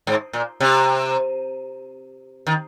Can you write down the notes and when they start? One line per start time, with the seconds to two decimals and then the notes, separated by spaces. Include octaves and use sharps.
0.07 G#2
0.33 A#2
0.60 C3
2.47 D#3